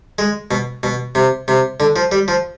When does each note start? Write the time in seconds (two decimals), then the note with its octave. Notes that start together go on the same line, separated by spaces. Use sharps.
0.19 G#3
0.51 B2
0.83 B2
1.15 C3
1.48 C3
1.80 D3
1.96 F3
2.12 G3
2.28 F3